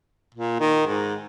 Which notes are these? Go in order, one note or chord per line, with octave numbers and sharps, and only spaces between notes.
A#2
D#3
G#2